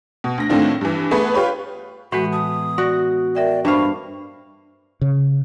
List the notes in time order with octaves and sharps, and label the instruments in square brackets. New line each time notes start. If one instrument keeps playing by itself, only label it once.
[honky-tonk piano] B2
D2 A#6
A2 D3 D#3 C4 D4 F4
G2 E3
A3 B3 G#4 B4
F4 G4 B4 C#5
[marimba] A2 E3 G#3 [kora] B3 [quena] F#4
[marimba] A5 [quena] D#6
[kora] F#4 [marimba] D5 C#6 A#6
[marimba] A#4 E5 G5 [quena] D5
[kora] G2 F5 [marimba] D4 C5 B5 [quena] C#6
[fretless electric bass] C#3